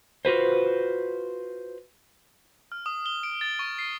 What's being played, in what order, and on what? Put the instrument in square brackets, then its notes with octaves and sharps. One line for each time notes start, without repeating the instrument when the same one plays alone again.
[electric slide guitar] F4 F#4 B4 C5
[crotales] F6
D#6
G7
D7
A6
C#6
C7